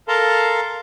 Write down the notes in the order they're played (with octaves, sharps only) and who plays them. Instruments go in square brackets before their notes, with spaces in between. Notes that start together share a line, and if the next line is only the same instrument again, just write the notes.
[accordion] A4 A#4 F5 A5 A#5 C6